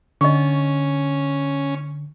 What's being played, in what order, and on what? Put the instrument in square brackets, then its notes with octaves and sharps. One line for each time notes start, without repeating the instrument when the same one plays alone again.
[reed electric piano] D3 [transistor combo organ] C#4 [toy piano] D#5 C#6